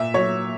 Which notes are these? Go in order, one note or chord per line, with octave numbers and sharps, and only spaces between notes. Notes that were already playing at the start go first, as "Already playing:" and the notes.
Already playing: A#2 E5
F#3 C#5